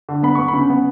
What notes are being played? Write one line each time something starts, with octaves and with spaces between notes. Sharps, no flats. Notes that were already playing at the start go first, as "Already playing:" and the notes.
D3
B3 B5
B3 C#6
B5
C#3
B3